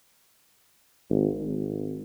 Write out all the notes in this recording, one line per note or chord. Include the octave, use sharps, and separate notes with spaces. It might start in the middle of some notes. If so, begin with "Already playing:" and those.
G#1
G#1